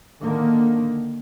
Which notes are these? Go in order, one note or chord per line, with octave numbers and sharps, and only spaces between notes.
D3 D#3 A#3